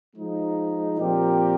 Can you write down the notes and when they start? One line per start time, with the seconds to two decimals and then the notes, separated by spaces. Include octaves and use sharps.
0.15 F3 G#3 D#4
0.99 A#2 F3 C4 G4 A#4